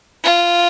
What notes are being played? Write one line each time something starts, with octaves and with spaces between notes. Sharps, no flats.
F4